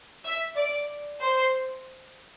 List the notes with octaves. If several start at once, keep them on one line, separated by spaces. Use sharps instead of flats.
E5
D5
C5